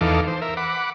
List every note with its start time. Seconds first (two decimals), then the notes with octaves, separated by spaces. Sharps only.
0.01 E2 E3 D#4 A4 F5 D6
0.27 C5
0.42 A#4 E5
0.57 F#5 B5 D6